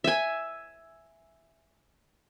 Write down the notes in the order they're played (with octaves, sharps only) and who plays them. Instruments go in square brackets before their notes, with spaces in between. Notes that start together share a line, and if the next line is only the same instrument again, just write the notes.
[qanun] E5 G#5